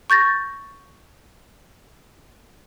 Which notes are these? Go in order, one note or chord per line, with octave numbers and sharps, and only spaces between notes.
C#6 G6 A6 A#6